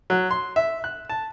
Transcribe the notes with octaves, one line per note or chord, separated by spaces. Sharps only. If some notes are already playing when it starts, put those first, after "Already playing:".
F#3
C6
E5
F#6
A5